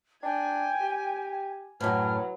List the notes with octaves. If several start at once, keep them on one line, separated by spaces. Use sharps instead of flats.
D4 G5 G#5
G4
F#2 A2 E3 F#3 F6